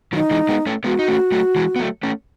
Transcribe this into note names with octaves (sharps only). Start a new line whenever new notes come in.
D#3 F#3 D#4
E3 G#3
G#3 B3
A3 C#4
G#3 B3 F#4
D#4
A3 C#4
F#3 A3
E3 G#3
B3
F#3 A3
A3 C#4